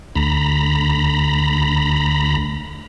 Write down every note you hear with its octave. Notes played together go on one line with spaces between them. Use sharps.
D2 A#5 B5